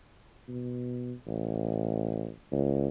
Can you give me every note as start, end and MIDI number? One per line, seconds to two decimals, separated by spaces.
0.48 1.13 47
1.27 2.30 33
2.52 2.88 37